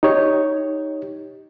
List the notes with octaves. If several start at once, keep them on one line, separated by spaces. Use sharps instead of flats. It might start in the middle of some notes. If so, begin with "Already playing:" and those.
D#4 G4 C#5